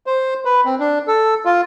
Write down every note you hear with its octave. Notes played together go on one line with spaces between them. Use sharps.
C5
B4
C4
D4
A4
F4